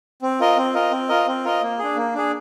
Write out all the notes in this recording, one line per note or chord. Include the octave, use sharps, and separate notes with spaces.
C4
F4 A#4 D#5
C4
F4 A#4 D#5
C4
F4 A#4 D#5
C4
F4 A#4 D#5
A#3
D4 G#4
A#3
D4 G#4